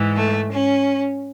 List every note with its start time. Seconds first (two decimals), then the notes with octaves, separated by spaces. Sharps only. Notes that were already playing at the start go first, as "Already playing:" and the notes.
Already playing: G#2 E3
0.15 A3
0.50 C#4